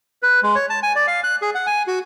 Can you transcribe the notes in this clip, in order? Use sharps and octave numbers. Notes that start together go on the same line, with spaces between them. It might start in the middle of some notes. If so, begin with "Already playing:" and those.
B4
G#3
C#5
A5
G#5
D5
F5
F#6
G#4
F#5
G#5
F#4